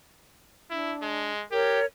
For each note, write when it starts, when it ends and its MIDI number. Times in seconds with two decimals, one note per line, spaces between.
0.70 1.32 62
0.70 0.95 64
1.02 1.44 56
1.51 1.79 67
1.51 1.85 70
1.51 1.85 73